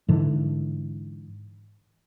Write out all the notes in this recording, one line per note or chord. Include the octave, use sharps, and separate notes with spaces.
G#2 D3 E3